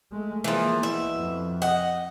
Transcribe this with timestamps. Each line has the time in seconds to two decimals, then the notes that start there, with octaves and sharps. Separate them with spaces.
0.11 G#3 A3
0.44 E3 F3 A#3 G#4
0.83 B2 E4 E5
1.14 F2
1.62 D#5 F#5